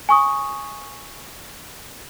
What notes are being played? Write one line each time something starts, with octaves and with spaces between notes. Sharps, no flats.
G#5 C#6 D#6